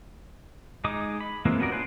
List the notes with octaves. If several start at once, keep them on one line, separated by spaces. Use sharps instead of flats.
G#3 D#4 D6 D#6
B5
E3 G#3 A#3 C4 F4
B3 C#4 F#4 A#4 D5
D4 F4 G#4 B4 C5